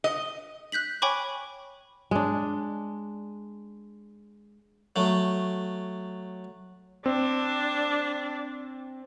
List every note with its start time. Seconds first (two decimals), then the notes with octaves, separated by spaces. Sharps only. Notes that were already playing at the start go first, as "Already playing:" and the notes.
0.04 D#5
0.72 F#6 G6 B6 F#7
1.02 C#5 G5 G#5 B5 C#6 D6
2.11 G#3 D4
4.96 F#3 A3
7.06 C4 D4